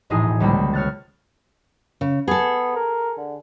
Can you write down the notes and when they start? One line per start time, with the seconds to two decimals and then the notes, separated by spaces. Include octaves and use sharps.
0.10 E1 A#1 A2 D#4 G#4 C7
0.40 C#2 D3 G3 A#3 C5 B5
0.73 C#5 F6 F#6 A6
2.01 C#3
2.28 B3 G#4 A4
2.76 A#4
3.17 D3